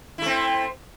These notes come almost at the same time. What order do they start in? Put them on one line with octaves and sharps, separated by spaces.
E4 A3 C4